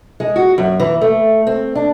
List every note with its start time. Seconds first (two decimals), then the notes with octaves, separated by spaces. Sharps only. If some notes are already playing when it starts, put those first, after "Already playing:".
0.20 G#3
0.36 F#4
0.58 F#2
0.80 E3
1.01 A3
1.47 C4
1.75 D4